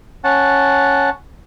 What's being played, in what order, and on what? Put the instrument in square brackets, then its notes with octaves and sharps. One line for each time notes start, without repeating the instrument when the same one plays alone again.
[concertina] C#4 F#5 A5